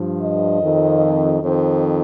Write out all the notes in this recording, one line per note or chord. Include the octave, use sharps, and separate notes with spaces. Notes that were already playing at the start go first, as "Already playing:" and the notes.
Already playing: G2 F3
D#5
F2 D#3
F2 D#3 C5